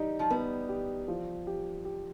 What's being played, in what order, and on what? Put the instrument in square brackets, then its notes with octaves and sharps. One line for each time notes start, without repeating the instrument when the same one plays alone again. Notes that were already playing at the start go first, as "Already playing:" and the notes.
Already playing: [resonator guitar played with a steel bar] G3 [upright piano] D#4 G4
[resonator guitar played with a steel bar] F3
[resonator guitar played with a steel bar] G3 [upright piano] B3
[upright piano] G4
F3
G4
G4